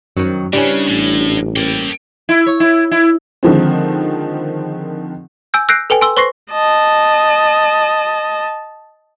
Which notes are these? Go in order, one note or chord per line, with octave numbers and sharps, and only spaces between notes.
F#2 D#3 F#3
C#3 G3 C#4 D4 E4 B4
A1 A2
A#3 A4 G5
E4
C#5
E4
E4
D3 D#3 F3 G#3 C4
G#5 E6 G6
E6 F#6 G6 A#6 C7 D7
A4 B4 G5 G#5
G#5 C6 E6 G7
B4 C5 C6 C#6 A#6 C7
D#5 A5